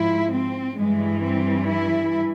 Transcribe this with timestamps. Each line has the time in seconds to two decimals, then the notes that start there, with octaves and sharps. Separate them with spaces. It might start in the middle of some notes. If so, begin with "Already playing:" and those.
Already playing: G#2 F3 E4
0.32 C4
0.77 G2 E3 G#3
1.23 C4
1.68 E4